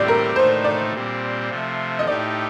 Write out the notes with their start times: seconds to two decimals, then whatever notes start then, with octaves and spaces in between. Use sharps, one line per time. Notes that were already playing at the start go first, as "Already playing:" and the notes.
Already playing: A2 G3 C4 G4 D5
0.08 A#4
0.36 A2 A3 D#4 C5
0.65 D5
0.93 A#2 G3 C4
1.49 C3 F3 A3
1.99 D#5
2.07 A2 A3 D#4 G4 D5